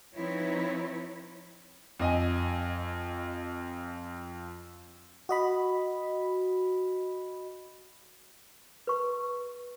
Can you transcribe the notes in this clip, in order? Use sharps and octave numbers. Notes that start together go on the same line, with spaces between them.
F3 C4 D#4 E4 B4 C#5
F2 D#5 G#5
F#4 D#5 B5
B4 C#6